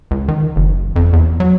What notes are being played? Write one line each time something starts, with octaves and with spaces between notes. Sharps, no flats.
C#2
D#3
F#1
F2
E2
F#3